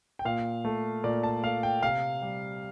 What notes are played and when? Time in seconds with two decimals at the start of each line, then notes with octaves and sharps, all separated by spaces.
0.19 G5
0.25 A#2 F5
0.65 A3
1.04 A#2 D5
1.23 A5
1.43 A3 F5
1.63 G5
1.83 C3 F5
2.22 G3